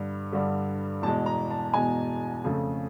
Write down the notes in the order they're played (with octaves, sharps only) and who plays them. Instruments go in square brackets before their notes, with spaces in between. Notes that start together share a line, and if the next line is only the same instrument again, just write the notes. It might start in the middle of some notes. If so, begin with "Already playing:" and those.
Already playing: [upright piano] G2 D3 G3
G2 D3 G3
E2 B2 G#3 A5
A#5
A5
E2 B2 G#3 G#5
F2 C#3 F3 A3